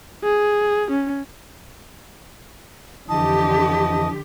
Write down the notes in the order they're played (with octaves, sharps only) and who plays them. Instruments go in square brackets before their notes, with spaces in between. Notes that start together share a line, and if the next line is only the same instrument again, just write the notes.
[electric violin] G#4
C#4
[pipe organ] F2 E3 D#5 [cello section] D3 G4 [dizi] A5